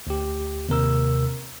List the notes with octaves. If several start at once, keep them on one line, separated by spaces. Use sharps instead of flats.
D2 G4
D#2 C3 A#4 E6